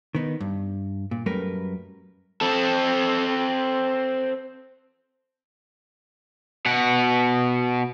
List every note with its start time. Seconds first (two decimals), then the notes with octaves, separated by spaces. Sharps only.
0.15 D#3 B3 D#4
0.40 G2
1.11 A#2
1.26 F#2 G3 A3 A#4 B4
2.41 C4 A4
6.66 B2 F#5